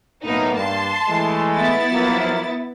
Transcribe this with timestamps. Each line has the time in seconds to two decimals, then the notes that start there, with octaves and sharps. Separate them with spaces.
0.25 B1 A2 A#3 B3 D#4
0.57 G2 A5 C6
1.08 E3 G#3 A3
1.55 B3 E4 A6
1.92 F3 F#3 A#3